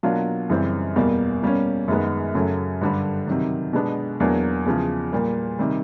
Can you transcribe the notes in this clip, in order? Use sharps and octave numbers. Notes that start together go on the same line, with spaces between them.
B2 F#3 A#3 D4 F4
F#2 C#3 E3 G3 C4
E2 B2 G3 A#3
B2 G3 A#3 C#4
F#2 D#3 G#3 B3
F#2 C#3 F#3 A3
G2 D3 G3
C3 D#3 F#3
B2 G#3 B3 D4
E2 B2 F#3 A#3 D4
E2 C#3 F3
A#2 G3 A#3
C3 D#3 G3